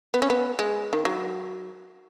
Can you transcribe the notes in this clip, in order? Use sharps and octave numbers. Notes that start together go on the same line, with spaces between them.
B3
C#4
B3
G#3
D#3
F#3